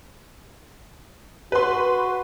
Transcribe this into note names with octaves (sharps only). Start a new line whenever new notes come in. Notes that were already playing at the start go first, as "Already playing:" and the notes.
F#4 B4 C6